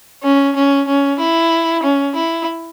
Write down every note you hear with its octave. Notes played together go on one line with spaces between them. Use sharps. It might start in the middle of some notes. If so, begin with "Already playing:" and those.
C#4
C#4
C#4
E4
C#4
E4